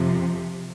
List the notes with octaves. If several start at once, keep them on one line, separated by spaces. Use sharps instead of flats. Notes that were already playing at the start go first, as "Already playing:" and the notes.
Already playing: F2 C3 F3